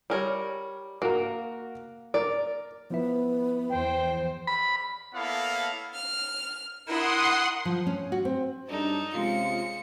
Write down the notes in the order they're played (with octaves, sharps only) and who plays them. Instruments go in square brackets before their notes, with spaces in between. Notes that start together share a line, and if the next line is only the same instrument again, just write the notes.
[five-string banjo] G3 A#4 C#5
[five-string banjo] A#3 [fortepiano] F#4 A#4
[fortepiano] A#4 [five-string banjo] D5
[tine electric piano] F3 E4 E5 [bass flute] B3
[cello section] E2 C5 [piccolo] G5
[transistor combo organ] B5
[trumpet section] A#3 B3 E4 A4 C#5 F5
[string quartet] F6
[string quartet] E4 A#4 [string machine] F#5 C6 D#6
[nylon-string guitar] F3
C#4
F#4
C4
[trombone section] F#2 G3 D4 [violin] D#4 A4
[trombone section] C3 C#4 F4 [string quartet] G#3 [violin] C#7